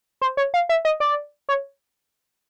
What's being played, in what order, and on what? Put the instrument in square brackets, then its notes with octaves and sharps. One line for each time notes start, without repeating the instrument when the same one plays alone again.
[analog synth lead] C5
C#5
F5
E5
D#5
D5
C#5